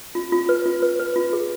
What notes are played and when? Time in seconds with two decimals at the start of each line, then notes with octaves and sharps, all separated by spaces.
0.15 F4
0.32 F4
0.49 B4
0.66 F4
0.82 B4
0.99 B4
1.16 F4
1.33 G#4